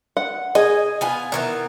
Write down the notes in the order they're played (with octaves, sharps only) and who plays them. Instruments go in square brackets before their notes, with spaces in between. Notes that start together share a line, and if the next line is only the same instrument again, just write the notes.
[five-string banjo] F#5
[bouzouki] G#4 [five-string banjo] D#5
[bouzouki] B3 F4 G#5
[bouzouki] D#3 E3 B3 [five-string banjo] A#5